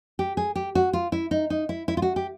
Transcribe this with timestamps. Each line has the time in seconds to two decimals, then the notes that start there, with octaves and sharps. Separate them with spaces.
0.19 G4
0.37 G#4
0.56 G4
0.75 F#4
0.93 F4
1.12 E4
1.31 D#4
1.50 D#4
1.69 E4
1.88 E4
1.97 F4
2.02 F#4
2.16 G4